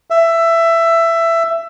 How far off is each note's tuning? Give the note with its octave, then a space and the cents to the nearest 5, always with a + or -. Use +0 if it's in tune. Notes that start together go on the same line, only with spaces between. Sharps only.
E5 +15